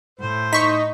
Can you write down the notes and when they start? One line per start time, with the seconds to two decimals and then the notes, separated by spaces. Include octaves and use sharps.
0.20 A2 C5
0.53 D#4 C#6 B6